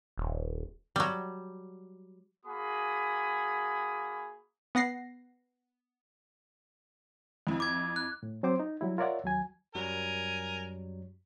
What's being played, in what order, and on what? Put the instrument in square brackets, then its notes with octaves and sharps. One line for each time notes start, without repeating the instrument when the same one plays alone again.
[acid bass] D#1
[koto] F#3 G3
[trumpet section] A#3 F#4 G#4 B5 D#6
[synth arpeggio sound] B3 F#5 A#6 C7
[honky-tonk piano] F2 E4
[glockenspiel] D6 G#6
F#6
[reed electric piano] A2
F#3 C4 C5 D6
D#4
F#3 G3 E4
F4 A#4 C#5 D5 E5 F#5
D#2 F#3 G#5
[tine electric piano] F#2 F#3 G3 [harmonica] A#4 G#5